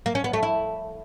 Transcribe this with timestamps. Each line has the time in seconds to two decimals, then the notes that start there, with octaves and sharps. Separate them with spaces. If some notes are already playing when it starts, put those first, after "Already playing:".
0.06 A#3
0.15 C#4
0.24 B3
0.33 A3
0.43 E4